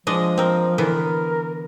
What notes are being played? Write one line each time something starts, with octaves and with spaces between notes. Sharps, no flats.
F3 G#3 D4 D#5
C4 A#4
D3 E3 B3 A#4